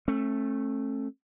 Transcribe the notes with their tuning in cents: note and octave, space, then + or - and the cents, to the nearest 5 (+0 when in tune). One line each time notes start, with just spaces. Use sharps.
A3 +0 C#4 -45